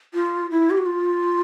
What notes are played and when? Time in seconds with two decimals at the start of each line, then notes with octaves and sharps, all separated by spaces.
0.14 F4
0.51 E4
0.70 G4
0.78 F#4
0.86 F4